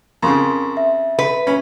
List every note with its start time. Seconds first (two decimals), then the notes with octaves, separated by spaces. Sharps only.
0.22 F2 C#3 A#4 C6 C#6
0.77 E5
1.19 B4
1.47 C#4 B5